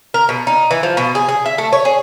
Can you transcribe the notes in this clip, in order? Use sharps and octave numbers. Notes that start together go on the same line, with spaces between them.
A#4
B2
D#4
E3
F3
B2
G#4
G#4
E5
A3
C#5
G#4